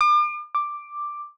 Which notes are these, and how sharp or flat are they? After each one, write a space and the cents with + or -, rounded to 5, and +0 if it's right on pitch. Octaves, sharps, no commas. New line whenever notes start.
D6 +40
D6 +5